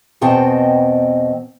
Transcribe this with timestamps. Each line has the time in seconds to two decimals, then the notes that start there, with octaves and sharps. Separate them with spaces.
0.21 E2 B2 C4 D#5 G5 A5